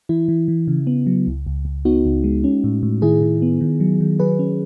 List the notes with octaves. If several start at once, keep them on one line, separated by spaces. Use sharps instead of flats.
E3 E4
E3
E3
C#3
B3
F#3
C#2
C#2
C#2
B3 D#4 F#4
C#2
G#3
C#4
A2
A2
D#3 E4 G#4
D#3
B3
D#3
F#3
D#3
F#3 G#4 B4
C#4